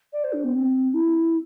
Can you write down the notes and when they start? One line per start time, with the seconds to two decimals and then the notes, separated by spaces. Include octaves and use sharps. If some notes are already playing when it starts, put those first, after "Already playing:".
0.13 D5
0.24 C5
0.33 D4
0.44 B3
0.54 C4
0.94 E4